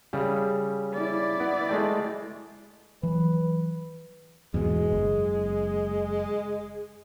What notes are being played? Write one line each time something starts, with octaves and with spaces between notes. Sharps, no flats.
C#3 G3
E4 D5
B3
G#3 A3 G5
E3 F#3 B4
E2 G#2 B2 G#3
F#1